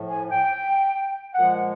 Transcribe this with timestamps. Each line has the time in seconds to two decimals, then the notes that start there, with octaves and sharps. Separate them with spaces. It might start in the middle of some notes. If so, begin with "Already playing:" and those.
Already playing: A2 F3 A3
0.08 G#5
0.30 G5
1.34 A#2 F3 G#3 F#5